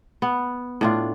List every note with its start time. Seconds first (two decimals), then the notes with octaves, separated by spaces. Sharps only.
0.22 B3
0.81 A2 D4 F4